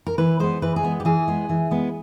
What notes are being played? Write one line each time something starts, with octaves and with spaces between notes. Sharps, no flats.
A#4
E3 B4
G#3 B3 C5
E3 B4
G#4
G#3 B3
G4
E3 G#4
G#3 B3
E3
G#3 B3